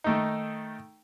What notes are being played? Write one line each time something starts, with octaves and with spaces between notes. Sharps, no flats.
D#3 A3 D#4